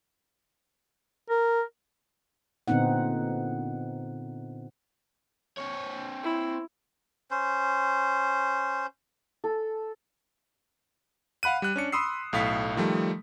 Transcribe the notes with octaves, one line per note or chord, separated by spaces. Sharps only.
A#4
A#2 D3 B3 C4 D#4 F#5
C4 C#5
E4
C#4 C5
A4
F5 F#5 B5 F#6 D#7
G3 F#6
C#4 D4 C#7
B5 C6 D#6 E6 C7
B1 A2 F5 B6
D#3 F3 G3 A3